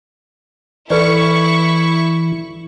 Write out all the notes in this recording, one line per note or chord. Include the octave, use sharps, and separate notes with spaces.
E3 E4 A4 B4 D5 C#6